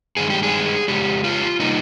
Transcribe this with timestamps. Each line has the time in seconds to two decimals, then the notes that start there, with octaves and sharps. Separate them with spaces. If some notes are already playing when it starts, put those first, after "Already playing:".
0.17 G2 D#3 G#3 G#4
0.30 G4
0.43 G#4
0.88 F2 C#3 G#3 G4
1.24 F4
1.59 C3 G3 A#3 D#4